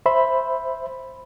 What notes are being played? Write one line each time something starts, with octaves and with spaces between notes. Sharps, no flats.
C5 E5 B5